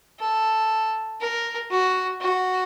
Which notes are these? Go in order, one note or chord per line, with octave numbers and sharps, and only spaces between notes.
A4
A#4
F#4
F#4